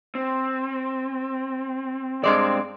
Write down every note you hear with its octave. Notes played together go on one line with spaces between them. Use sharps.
C4
G2 G#3 C4 D5